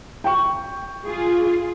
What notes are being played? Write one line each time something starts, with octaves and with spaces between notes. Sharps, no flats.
G5 C#6
F4 G#4